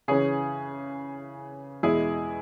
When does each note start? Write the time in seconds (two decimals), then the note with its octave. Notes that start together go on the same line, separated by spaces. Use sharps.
0.08 C#3 E3 C#4 G#4 C#5
1.83 E2 B2 G#3 E4 G#4